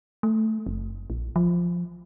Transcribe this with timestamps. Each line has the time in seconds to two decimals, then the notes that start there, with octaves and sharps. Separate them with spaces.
0.23 A3
0.67 F#1
1.10 A#1
1.36 F3